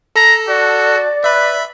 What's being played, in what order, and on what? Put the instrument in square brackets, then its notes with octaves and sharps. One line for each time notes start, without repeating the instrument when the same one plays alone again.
[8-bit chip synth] A4 [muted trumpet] A#5
[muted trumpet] F#4 [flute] D5
[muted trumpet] B4 [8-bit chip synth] E5 B5